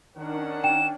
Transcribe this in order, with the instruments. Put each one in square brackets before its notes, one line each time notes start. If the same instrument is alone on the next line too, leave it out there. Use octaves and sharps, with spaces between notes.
[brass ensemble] D#3 A#4 F#5 [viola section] C#4 D4
[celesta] G5 [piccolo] E7